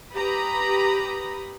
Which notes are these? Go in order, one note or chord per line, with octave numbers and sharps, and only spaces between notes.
G4 B4 A#5 B5 D#6